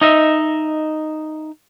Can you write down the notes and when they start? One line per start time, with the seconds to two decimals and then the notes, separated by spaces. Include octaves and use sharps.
0.01 D#4 D#5 E5